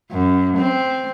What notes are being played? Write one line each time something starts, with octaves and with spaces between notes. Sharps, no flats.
F#2
C4